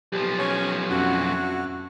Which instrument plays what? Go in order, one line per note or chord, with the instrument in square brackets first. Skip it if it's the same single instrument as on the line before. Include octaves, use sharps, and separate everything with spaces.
[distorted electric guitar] B1 F3 [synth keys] G4
[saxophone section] C#4 C#5 [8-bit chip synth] G#5 C#6
[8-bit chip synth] F2 [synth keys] C#4 [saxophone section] D4 E4 F#4